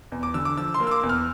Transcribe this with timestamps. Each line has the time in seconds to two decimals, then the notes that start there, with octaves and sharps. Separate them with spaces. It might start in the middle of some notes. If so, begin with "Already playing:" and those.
0.12 E2
0.23 D6
0.34 D3 E6
0.45 D6
0.57 F3 E6
0.74 C6
0.80 A#3
0.87 E6
0.91 D6
1.03 E2
1.09 F6